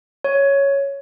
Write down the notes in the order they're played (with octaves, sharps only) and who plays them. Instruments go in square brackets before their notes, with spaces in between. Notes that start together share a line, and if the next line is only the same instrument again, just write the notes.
[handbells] C#5